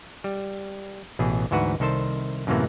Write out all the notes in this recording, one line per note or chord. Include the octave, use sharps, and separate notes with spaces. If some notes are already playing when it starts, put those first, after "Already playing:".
G3
A1 B2 E3 G#4
D2 G#2 E3 F#4 B4
C2 D#3 A4 C5 A5
F#2 A2 C3 E3 A#3 B3